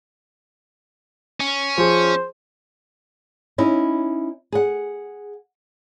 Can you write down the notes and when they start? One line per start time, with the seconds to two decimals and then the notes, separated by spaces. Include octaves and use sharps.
1.40 C#4
1.78 F3 G#4 C5
3.58 C#4 D#4 E4
4.52 G#4 F#5